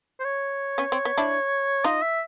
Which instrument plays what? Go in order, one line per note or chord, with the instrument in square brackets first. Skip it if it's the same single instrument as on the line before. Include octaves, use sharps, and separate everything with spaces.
[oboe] C5
C#5
[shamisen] B3 C#4
C4
B3
D4 E4
[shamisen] D#4 F4 [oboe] D#5
[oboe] E5